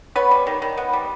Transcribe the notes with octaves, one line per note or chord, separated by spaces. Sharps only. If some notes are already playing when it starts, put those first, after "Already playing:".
B3 B4 C#5
G3
D#3
D#3
B3
G3